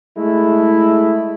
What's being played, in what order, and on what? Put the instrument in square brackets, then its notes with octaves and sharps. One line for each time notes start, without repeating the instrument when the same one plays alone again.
[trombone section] G#3 A3 E4